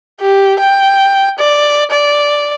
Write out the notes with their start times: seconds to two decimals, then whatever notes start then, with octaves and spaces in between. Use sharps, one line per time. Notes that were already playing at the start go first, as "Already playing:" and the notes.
0.21 G4
0.60 G5
1.38 D5
1.91 D5